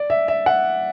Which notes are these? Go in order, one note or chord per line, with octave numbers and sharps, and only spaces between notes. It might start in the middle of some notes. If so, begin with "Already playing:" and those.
Already playing: D5
E5
E5
F#5